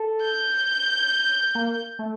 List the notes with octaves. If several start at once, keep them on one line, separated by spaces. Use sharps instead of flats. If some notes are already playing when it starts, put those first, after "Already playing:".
Already playing: A4
G6
A#3
A3